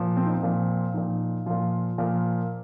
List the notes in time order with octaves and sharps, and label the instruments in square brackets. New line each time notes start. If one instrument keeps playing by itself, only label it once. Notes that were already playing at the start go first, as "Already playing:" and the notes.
Already playing: [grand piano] A#2 F3
C4
D#4
C4
A#2 F3
A#2 F3 D#4
A#2 F3 F4
A#2 F3 A#4